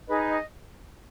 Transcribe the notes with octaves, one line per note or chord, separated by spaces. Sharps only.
D#4 G#4 B4 D#5
D#5